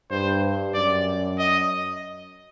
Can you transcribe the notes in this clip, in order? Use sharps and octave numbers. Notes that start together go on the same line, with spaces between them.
G2 C5
F#2 D5
D#5